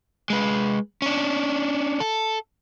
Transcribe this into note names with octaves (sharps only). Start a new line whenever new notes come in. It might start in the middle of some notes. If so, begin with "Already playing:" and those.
G#3 B4
C#4 D4
A4